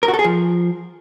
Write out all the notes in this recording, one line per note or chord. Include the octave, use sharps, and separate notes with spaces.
A#4
F#4
A4
G#4
F3